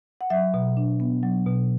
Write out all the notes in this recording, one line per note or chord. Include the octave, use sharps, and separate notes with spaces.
F#5
F#3 E5
B2
D4
B3
F#3
B2